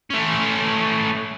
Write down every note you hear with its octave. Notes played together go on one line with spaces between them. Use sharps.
A3 C#4